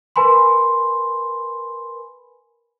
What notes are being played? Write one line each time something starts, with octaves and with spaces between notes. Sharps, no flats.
A#4 B4 G#5 B5 C6